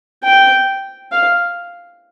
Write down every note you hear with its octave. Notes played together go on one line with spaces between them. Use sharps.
G5
F5